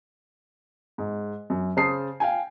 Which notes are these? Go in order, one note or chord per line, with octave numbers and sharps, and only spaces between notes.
G#2
F#2
C#3 C5 A5 D#6 C7
F5 G5 G#5